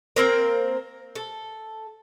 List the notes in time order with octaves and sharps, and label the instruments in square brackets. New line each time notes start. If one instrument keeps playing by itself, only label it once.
[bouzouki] A#3 C4 A#4
A4